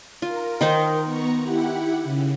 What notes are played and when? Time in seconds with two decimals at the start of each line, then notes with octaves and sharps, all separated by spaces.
0.22 F4 A#4
0.61 D#3 D#4 C5
1.04 B3 A#5 C#6
1.41 E4 G4 F#5
2.03 C#3